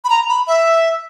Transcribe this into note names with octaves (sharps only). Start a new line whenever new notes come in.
B5
A#5
B5
E5